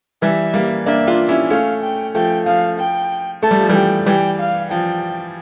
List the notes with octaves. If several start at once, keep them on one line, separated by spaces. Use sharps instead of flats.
E3 G3 E5
G3 A#3
A#3 D4 E5
D4 F4
C#4 E4
A3 C#4 F5
G5
F3 A3 G5
F3 F5
G5
A3 A5
G3
F3
E3 G3
G5
E3 G3 G5
F5
F3 G5